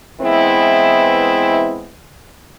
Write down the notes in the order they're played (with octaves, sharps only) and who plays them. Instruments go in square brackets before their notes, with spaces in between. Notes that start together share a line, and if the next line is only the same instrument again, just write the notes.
[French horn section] E3 G#3 B3 C4 E4